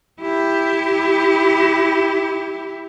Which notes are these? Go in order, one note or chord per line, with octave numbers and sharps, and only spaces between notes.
E4 G4